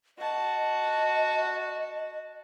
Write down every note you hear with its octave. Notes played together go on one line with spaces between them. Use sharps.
F#4 D#5 A5